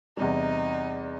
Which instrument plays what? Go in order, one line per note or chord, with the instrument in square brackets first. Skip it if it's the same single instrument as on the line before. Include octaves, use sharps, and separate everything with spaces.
[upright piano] E2 C3 G3 [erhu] D#4